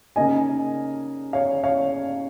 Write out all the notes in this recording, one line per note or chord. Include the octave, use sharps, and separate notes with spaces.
C#3 A#3 D#4 D#5 G#5
C#5 F5
C#5 F5